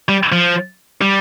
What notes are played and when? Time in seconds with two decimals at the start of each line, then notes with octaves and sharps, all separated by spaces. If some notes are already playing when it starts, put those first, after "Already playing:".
0.09 G3
0.32 F3
1.02 G3